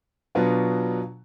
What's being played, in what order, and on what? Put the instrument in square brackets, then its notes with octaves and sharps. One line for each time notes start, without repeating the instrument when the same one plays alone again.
[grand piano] B2 F#3 B3 D4 F4